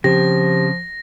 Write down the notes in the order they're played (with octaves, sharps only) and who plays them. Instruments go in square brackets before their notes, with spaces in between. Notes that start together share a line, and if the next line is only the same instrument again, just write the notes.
[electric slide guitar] C#3 C4 [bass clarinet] F3 [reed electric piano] G4 [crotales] A#6